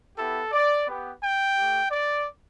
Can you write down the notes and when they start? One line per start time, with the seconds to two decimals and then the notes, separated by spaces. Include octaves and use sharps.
0.17 B3 E4 G4 A4
0.52 D5
0.86 B3 G4
1.21 G5
1.56 A3 G4
1.90 D5